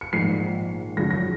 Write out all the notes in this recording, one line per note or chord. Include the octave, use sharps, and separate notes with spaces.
C#7
A#1 G#2 D#3 C7
G#1 F#2 C#3 F3 A#6
A#6